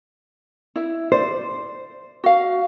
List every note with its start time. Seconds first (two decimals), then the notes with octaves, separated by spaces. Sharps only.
0.76 E4 E5
1.12 C5 D5
2.24 F#4 F5